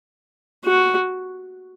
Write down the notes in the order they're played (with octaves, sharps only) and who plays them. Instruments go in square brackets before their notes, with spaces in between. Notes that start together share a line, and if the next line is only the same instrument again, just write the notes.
[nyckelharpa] F#4